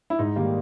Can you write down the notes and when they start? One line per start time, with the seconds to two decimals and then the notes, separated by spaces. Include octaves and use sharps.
0.10 E4
0.19 G#2 D#4
0.36 D#3 G3 A#3